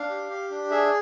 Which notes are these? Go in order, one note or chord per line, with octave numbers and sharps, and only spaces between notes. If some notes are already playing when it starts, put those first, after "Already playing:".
Already playing: D4 F5
G4
G4
D4
G#4 E5